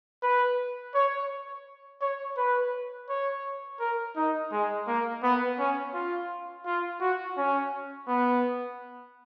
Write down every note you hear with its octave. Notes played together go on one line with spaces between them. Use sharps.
B4
C#5
C#5
B4
C#5
A#4
D#4
G#3
A#3
B3
C#4
F4
F4
F#4
C#4
B3